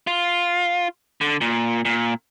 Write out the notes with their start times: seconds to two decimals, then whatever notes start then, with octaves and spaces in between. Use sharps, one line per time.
0.07 F4
1.21 D3
1.41 A#2
1.85 A#2